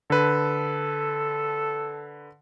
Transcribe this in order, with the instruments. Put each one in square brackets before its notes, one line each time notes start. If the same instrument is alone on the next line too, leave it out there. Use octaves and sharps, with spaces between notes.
[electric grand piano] D3 B4 [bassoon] A4